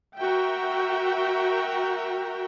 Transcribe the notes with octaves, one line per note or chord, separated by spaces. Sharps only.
F#4 A#4 E5 G5